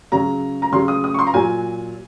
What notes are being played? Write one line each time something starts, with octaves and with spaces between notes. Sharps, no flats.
C#3 F#3 A#5
A#5
C#3 F#3 C6
D#6
D#6
C#6
C6
A#5
A#2 F#3 G#5